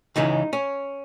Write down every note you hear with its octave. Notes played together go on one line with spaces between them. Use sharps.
C#2 C#3 E3 G#3 D#4
C#4